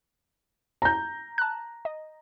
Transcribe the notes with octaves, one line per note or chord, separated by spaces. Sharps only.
A#5 G6
A5 F#6
D#5